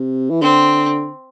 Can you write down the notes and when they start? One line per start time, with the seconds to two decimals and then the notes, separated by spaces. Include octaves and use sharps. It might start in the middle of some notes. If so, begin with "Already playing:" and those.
Already playing: C3
0.31 E3
0.42 D3 C4